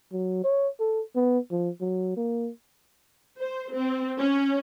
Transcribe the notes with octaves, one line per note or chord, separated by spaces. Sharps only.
F#3
C#5
A4
B3
F3
F#3
A#3
C5
C4
C#4